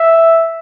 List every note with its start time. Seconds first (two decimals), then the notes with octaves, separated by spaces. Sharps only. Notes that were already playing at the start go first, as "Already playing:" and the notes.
Already playing: E5